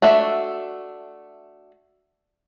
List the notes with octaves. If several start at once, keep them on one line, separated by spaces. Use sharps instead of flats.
A3 D4 F#4 E5